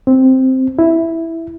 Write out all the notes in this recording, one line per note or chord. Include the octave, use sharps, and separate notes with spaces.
C4
E4